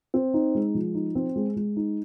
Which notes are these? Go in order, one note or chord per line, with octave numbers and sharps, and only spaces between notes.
C4
D#4
G#3
F3
D#4
C4
G#3
G#3
D#4